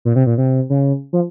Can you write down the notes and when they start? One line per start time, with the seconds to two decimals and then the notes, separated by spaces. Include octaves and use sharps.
0.05 A#2
0.16 C3
0.26 A#2
0.38 C3
0.70 C#3
1.13 F3